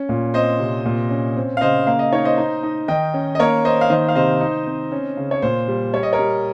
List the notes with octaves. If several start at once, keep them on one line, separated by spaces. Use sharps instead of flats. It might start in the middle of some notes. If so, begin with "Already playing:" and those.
Already playing: C#4
A#2
C4 C5 D#5
C3
A#2
C#4
C4
F5
C#3 C5 D#5
A#3 F5
D#5
D#4 C#5
C5 D#5
D#4
D#4
D#3 D#5 G5
C#4
D#5
A#3 A#4 C#5
A#3 C5 D#5
F5
D#3 C5 D#5
F5
C3 C5 D#5
D#4
C4
C#4
C#3
C#5
A#2 C5
G3
G3 C#5
D#5
A#4 C#5
G3